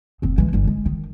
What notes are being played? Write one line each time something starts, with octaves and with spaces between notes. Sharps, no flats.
F1 C4
E3 G#3
G1 E3
G#3
D#3